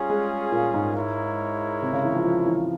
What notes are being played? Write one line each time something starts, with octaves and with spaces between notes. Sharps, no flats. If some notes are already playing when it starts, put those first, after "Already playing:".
Already playing: G3 C#4 F4 G#4
G#3
A#2
G#2
G#3 E4 A#4 C#5
C3
C#3
E3
F3
F3
E3